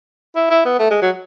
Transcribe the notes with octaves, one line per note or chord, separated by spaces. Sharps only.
E4
E4
B3
A3
G#3
F#3